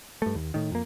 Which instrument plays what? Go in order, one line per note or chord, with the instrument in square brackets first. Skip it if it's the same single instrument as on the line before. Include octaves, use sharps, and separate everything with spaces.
[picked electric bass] G2 A3
D#2
A2 D#3
F2 A#3